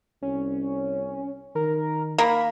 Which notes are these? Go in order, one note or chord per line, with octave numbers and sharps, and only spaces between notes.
C2 C#4
D#3 A#4
A#3 B5